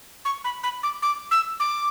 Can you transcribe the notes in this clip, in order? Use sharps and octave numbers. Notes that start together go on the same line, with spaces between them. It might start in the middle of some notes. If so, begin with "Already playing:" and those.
C#6
B5
B5
D6
D6
E6
D6